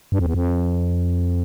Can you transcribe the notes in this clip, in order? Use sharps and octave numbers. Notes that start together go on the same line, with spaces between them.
G2
F2
E2
F2